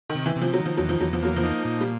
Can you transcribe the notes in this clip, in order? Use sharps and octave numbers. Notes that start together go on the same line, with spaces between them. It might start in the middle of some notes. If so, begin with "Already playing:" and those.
D#3
C3
E3
C3
F3
D#3 F#3
F3
E2 F#3
F3
E2 F#3
F3
F#3 A#3
F3
D#4
A#2
G3